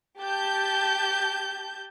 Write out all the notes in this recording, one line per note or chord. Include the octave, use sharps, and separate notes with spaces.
G4 A5 G6